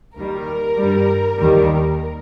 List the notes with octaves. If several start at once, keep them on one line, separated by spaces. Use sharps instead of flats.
D#2 D#3 G3 A#4
G2 G3
D#2 D#3 G3